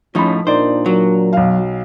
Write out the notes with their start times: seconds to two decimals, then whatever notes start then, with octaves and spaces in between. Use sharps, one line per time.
0.15 A2 F3 C#4 D#4 B5
0.47 A#2 D4 D#4 A#4 C5 D5
0.86 F#3
1.33 B1 F5